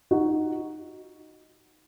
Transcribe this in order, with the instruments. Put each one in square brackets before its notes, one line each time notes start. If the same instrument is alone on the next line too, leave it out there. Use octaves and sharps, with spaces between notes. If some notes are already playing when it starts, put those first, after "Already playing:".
[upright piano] D#4 F#4